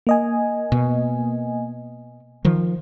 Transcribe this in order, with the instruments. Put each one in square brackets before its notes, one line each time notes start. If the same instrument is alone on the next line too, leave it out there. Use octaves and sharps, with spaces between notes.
[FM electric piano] A#3 D#5 G#5
[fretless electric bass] B2
D#3 F3